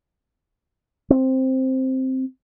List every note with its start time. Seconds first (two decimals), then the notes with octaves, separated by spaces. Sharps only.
1.10 C4